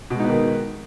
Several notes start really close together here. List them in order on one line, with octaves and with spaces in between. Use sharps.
B2 G#3 D#4 B3 D#3